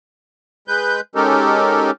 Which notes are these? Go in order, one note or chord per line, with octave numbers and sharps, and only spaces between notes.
G#3 B4 G6
G#3 C#4 D#4 G4 A4 A#4